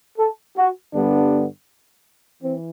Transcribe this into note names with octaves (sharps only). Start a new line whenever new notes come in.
A4
F#4
G2 D3 G3 B3 D4
E3 C4